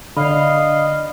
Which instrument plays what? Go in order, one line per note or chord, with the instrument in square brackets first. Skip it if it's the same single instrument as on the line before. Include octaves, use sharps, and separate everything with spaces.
[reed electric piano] D3 [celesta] D5 B5 [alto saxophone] D#5 [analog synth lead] F5